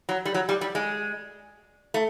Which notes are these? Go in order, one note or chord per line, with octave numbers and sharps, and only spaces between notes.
F#3
G3
F#3
G3
G3
G#3
A3